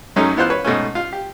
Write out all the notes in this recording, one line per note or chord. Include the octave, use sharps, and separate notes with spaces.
F#2 F#3 A3 C#4 D#4
E3 B3 F4 C5 F#6
B4 C#5
G#2 B2 A3 C#4
F4
G4